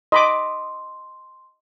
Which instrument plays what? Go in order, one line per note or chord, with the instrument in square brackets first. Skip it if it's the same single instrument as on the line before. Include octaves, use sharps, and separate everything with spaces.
[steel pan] D#5 B5 D6 [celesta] C6